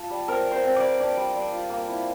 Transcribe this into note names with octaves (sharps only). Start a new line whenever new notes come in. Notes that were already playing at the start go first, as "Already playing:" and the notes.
Already playing: F4 A5
G3
C4 A#4
C4
C5
C4
G3 D5
D4
G3
G3
F4
A#3
E4